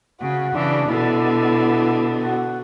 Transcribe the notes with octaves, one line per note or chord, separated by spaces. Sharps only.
C#3 F#4
C#3 E3 D4
B2 D3 E4
F#4